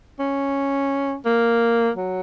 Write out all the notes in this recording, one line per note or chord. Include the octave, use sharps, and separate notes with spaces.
C#4
A#3
F#3